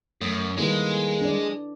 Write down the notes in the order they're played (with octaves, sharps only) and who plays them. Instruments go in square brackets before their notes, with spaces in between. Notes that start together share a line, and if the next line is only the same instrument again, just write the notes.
[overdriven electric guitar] F#2 [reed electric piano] A3 D#6
[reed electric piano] E2 D#3 G3 [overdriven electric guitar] G#3 [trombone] A#3 [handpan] E4 A4 B4
[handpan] D4 D5